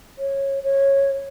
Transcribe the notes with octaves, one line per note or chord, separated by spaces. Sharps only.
C#5
C#5